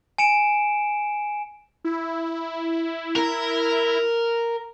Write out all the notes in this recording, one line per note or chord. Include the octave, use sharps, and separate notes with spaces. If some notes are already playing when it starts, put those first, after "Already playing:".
G#5 C#7 D7 E7
E4
A#4